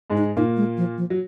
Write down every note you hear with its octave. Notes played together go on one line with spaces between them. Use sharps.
G#2 G#3
D#4
A#2 A#3 D#4
G#3
F3
F3
F#3